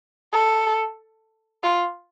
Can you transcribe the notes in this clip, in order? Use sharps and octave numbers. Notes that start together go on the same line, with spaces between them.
A4
F4